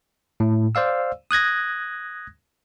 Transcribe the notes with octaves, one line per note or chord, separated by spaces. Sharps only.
A2
C5 D5 F5 E6
D#6 F#6 G#6 A#6